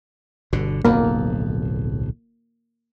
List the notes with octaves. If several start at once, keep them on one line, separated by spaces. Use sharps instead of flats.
G1 B2 D3
D1 B1 F2 A#3